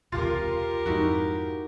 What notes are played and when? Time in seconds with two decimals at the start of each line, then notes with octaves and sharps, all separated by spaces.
0.12 E1 C#2 C3 F4 G4 A#4 A6
0.86 F2 G#2 D#4 E4 F#4